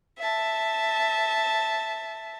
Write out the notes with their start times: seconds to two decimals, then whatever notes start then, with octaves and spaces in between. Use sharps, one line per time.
0.19 E5 A5